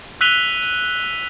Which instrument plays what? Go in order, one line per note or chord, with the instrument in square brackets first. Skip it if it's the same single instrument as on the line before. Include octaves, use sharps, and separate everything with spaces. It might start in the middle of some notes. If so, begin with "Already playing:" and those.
[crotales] E6 F#6 B6 D#7 F7 G7